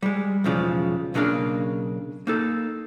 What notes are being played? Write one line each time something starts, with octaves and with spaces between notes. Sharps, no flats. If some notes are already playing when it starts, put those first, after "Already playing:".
G3 G#3
B1 E2 C#3 F3 G#3 D5
B1 C#3 A3 A#3 D4 F5
A#3 D#4 A4